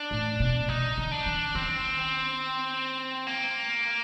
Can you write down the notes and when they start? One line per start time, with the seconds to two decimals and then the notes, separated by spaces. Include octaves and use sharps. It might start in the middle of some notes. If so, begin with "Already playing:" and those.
Already playing: D4
0.11 A2
0.40 B2
0.68 C3 D#4
0.98 D3
1.11 D4
1.26 D#3
1.55 D#3 C4
3.27 A#3